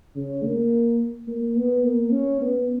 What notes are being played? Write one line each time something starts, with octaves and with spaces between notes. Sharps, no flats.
C#3
A#3
A#3
B3
A#3
C#4
B3